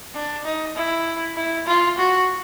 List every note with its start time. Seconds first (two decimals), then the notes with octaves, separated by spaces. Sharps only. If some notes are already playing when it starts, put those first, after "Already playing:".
0.15 D4
0.45 D#4
0.76 E4
1.36 E4
1.67 F4
1.98 F#4